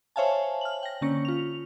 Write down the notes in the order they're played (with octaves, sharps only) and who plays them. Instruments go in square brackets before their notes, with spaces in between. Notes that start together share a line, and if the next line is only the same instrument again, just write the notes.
[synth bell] C5 C#5 E5 F5 G#5 A5
F6 F#7
G5 A#6
D3 A#3 C#4 A#6 C#7
F4 F7